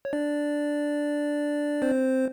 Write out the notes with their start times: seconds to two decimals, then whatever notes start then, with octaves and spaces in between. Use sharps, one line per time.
0.05 C#5
0.13 D4 D5
1.82 C4 C5